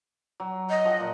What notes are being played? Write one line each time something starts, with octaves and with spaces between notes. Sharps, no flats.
F#3
D#5
F3 F#5 G5
A#2